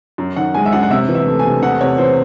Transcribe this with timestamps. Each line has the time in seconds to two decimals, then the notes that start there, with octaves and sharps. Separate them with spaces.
0.18 F#2
0.36 D#3 F#5
0.54 G#3 G#5
0.66 E5
0.72 F#2 F#5
0.83 F#5
0.91 C3 E5
1.09 E3
1.15 E5
1.27 A3
1.39 G#5
1.44 C3
1.62 E2 F#5
1.81 C3 C#5
1.98 E3 C5